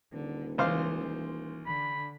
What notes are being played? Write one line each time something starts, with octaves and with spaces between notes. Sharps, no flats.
D#1 D3
C#2 E3 C5 F5
E3
D3 B5